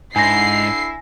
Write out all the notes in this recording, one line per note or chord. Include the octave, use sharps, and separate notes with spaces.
G#2 D3 E4 G#5 E6 A#6 C7